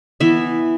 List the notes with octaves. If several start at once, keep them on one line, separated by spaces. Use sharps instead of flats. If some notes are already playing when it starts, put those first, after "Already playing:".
E3 B3 E5